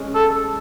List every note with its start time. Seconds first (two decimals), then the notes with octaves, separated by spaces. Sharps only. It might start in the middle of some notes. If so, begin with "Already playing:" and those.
Already playing: G#3 C#4
0.15 A4